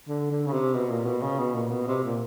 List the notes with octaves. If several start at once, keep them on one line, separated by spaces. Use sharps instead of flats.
D3
D3
C#3
C3
B2
A#2
B2
C#3
B2
A#2
B2
C3
A#2